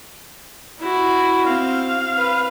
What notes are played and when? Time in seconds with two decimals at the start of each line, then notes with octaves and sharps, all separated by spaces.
0.79 E4 F#4
1.46 C4 F5
2.17 B4